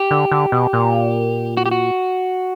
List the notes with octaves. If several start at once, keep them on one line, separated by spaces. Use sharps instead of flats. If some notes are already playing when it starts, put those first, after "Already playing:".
Already playing: G4
D3
D3
B2
A#2
F#4
G4
F#4